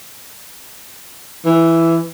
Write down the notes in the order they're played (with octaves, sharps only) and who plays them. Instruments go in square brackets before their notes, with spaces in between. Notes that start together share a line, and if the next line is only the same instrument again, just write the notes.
[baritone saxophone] E3